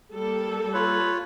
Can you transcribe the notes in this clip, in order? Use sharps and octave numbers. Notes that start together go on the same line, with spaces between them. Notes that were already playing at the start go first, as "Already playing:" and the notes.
G3 A#3 A4
F4 B4 C#5